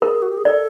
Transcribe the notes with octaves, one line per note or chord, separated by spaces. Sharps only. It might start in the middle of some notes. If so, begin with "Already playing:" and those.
G#4 A#4
F#4
G4
G#4
A4 D5